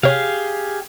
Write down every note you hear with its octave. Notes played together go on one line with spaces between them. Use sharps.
C3 G4 G#4 C#5 F5